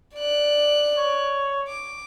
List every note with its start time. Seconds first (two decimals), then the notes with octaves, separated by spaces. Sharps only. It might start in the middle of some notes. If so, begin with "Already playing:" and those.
0.15 D5 F#6
0.97 C#5
1.68 D6